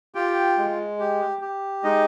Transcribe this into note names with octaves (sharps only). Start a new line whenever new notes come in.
F4 G4 G5
G#3
G4
G4
G#3 D#4 D#5